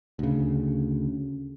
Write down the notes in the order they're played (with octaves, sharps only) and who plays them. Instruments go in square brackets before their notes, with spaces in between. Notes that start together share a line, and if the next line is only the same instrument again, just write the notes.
[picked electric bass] D2 C#3